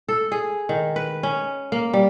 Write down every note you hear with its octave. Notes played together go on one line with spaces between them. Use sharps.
A4
G#4
D#3
B4
C#4
A#3
G3